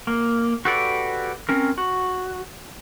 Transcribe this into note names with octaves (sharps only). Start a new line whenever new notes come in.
A#3
F#4 G4 A4 B4 D5
C4 C#4 A#4
F#4